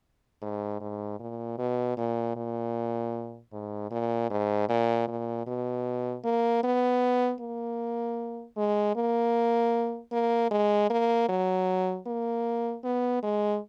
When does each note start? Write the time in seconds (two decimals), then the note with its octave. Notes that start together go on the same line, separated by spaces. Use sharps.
0.42 G#2
0.81 G#2
1.20 A#2
1.58 B2
1.97 A#2
2.36 A#2
3.53 G#2
3.91 A#2
4.30 G#2
4.69 A#2
5.08 A#2
5.46 B2
6.24 A#3
6.63 B3
7.41 A#3
8.57 G#3
8.96 A#3
10.12 A#3
10.51 G#3
10.90 A#3
11.29 F#3
12.06 A#3
12.84 B3
13.23 G#3